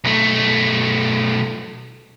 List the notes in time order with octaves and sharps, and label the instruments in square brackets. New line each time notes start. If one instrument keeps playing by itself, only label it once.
[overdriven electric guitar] B1 A3